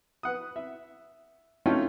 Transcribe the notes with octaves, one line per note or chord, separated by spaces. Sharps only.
B4 F#5 D#6
E5
A3 C#4 D#4 F4 G5